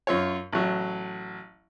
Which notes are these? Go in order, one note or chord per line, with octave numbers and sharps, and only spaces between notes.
F#2 F4 C#5
A1 F#3